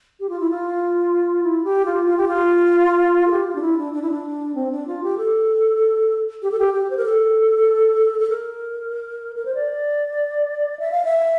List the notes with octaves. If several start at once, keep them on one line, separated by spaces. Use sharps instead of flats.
G4
F4
E4
F4
E4
G4
F4
F4
G4
F4
A4
G4
F4
D4
E4
D4
D4
E4
D4
C4
D4
F4
G4
A4
G4
A4
G4
G4
C5
A#4
A4
A4
A#4
A#4
C5
D5
E5
F5
E5